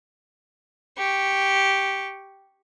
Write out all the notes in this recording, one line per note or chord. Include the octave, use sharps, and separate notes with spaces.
G4 C#6